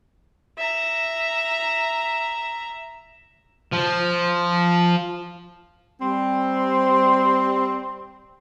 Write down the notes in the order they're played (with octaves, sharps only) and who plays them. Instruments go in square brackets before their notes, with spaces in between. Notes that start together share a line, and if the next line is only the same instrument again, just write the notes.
[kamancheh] E5 A#5
[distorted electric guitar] F3
[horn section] G3 C4